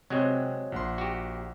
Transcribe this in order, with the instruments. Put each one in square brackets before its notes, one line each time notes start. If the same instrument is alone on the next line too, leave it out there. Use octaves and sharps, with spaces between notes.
[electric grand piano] C3 [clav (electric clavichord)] F#3 G#3 C4
[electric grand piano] A#1 F#5 C6
[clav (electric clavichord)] F#4 G4